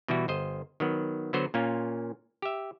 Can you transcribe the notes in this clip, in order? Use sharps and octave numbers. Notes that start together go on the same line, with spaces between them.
B2 E3 G3 E4 F#4
G1 C5 D#5
D#3 F#3 B3
D3 F#3 B3 F#4 C5
A#2 A#3 C#4 F4
G4 E5